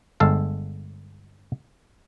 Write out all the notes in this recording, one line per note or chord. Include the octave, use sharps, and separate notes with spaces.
G1 G#3 A4 F5